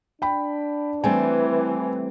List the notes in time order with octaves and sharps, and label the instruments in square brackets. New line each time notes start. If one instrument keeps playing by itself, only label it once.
[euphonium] D4 [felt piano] G5 B5
[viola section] E3 [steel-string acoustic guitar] G3 A3 C4 [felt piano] G#5